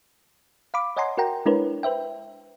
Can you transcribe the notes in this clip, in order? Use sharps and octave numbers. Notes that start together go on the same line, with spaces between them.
F5 B5 D6
C#5 D#5 F#5 G#5 A#5 C6
F#4 A#4 F#5 G5 A#5
G#3 D4 E4 A#4 B4 C#5
B4 C5 E5 G5